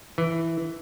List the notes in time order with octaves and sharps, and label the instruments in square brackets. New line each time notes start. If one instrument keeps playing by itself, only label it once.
[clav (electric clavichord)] E3